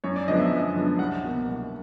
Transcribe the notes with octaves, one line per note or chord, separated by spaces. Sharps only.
F#2 C#5
D5
D3 F3 G#3 B3 D#5
E5
F#2
D3 F3 G#3 B3
C2 F#5
B2 F#3 A#3
C2